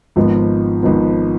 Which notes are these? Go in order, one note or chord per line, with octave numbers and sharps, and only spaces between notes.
G#1 G#2 F3 B3
G#1 G#2 F3 B3